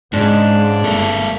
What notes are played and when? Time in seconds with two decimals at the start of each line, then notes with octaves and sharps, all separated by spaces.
0.13 G#2 C#3 G#3 D4
0.84 G1 A#3 A4